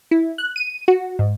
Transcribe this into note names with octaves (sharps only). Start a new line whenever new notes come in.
E4
F#6
D#7
F#4
G#2